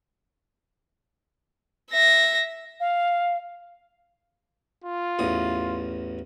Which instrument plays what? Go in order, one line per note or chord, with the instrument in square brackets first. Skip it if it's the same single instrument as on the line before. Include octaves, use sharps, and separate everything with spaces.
[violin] E5 A#6
[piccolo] F5
[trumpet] F4
[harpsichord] A1 E2 D#6